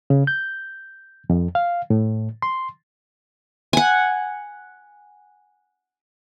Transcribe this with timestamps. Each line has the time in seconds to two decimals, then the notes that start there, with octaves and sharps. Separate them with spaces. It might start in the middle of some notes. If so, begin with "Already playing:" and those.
0.10 C#3
0.27 G6
1.30 F2
1.55 F5
1.90 A2
2.42 C6
3.73 F#5 G#5